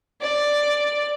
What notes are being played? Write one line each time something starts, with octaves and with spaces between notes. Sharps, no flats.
D5